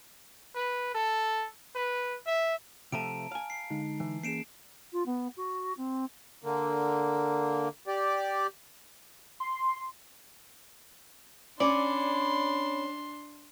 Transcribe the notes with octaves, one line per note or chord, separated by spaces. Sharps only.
B4
A4
B4
E5
C3 F3 A3 A5 A#5 D7
F5 G#5
C7
D3 G#3 D#4
E3
A#3 C#4 G#4 C7 D7 E7
F4
B3
F#4
C4
D3 A#3
G4 D5
C6
C#4 D4 D5 B5 C6